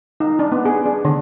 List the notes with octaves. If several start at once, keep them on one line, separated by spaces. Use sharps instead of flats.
D#4
D4
B3
G#4
D4
D3